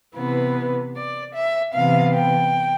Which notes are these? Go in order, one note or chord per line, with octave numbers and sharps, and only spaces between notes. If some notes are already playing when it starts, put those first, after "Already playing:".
C3 E3 B3 B4
D5
E5
C3 E3 B3 F5
G5